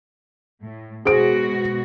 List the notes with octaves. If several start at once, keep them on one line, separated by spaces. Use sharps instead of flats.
A2
B2 G#3 F#4 G#4 C5 D7